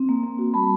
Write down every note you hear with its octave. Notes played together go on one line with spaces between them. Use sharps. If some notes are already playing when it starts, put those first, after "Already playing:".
Already playing: C4
A#3
A#3
F#4
G3 A5 B5